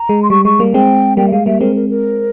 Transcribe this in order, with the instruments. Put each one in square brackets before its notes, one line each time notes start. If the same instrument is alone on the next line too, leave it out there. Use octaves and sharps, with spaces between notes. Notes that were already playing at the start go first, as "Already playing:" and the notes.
Already playing: [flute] A#5
[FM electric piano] G#3
[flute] C6
[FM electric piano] G3 [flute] C#6
[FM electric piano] G#3 [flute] C#6
[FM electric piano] G3 A#3
[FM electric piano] G#3 C4 [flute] G5
[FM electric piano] G3 A#3 [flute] G5
[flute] E5
[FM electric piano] G#3 [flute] F5
[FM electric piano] G3 A#3 [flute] E5
[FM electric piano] G#3 C4 [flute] A#4
[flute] A#4
A#4